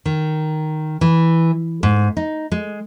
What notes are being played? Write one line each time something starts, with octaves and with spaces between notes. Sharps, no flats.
D#3
E3
G#2
D#4
G#3